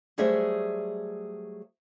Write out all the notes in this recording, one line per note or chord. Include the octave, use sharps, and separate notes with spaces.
F#3 G3 A3 G#4 C5 E5